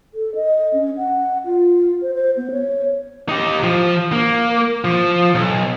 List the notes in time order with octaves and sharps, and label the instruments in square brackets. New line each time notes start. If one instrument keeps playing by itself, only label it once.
[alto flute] A4
D#5
C#4
F#5
F4
C5
C5
B3
C#5
[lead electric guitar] D#4 G4
F3
A#3
F3
B1